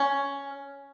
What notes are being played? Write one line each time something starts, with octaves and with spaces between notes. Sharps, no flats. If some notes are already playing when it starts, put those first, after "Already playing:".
Already playing: C#4